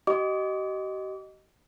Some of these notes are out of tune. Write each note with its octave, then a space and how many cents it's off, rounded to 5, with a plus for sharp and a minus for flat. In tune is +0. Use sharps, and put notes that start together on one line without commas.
G4 -45 D#5 +0 D6 -35